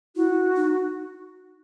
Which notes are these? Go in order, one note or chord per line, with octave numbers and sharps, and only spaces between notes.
E4 F#4
D#4